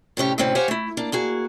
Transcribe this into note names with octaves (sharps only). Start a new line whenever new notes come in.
A2 C3 C#4 G4
D2 A2 C3 C4 C#4 E4
G4 C5 C#5 F5 F#5 G#5
A3 E4
A#3 D4
A#3 F#4 G#4